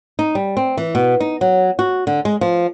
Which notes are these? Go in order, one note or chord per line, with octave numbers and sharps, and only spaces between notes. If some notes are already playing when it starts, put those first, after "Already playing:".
D#4
G3
C4
E3
B2
D#4
F#3
F#4
D3
G#3
F3